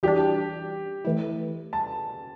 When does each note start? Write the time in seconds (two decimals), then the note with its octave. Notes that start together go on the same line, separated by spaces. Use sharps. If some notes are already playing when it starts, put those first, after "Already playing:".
0.03 E3 G3 D4 G4
1.05 E3 A3 E4
1.73 A5